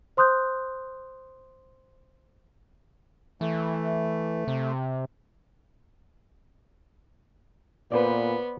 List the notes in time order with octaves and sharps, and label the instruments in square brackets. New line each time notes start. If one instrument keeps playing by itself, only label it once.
[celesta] C5 C6 D#6 F#6 G6
[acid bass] E3 [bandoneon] A3
[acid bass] C3
[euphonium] A#2 [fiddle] B3 [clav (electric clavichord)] B4 C5 D5